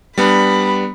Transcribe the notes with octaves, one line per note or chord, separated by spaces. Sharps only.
G3 B3 D4 B5